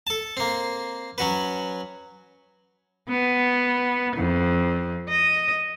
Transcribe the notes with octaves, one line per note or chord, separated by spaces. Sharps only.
A4 A5
A#3 C4
F#3 C#4 F#4 B4
B3
F2
D#5